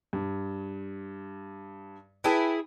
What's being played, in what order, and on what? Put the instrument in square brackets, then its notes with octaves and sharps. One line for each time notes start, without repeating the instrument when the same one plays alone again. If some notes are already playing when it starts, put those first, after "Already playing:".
[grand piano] G2
[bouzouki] E4 G#4 [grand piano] B4 G5 A5